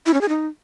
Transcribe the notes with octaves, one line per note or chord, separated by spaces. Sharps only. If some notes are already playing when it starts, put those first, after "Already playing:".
E4
C#4
G#4
D#4